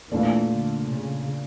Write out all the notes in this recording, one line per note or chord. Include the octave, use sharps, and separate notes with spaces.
A#2 E3 A3 D4 F4
D3
C#3